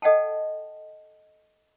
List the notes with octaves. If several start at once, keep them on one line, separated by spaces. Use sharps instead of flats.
A4 D#5 F#5 G5 A5